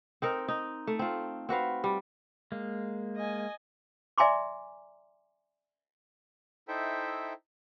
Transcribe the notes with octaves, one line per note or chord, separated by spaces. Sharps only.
C4 D#4 A#4
D#4
A3
C4 F4
C4 F#4 B4 F5
G3
G#3 A#3
D#5 G#5
D5 E5 G#5 A#5 C6 D6
D#4 E4 A4 C5 E5 G5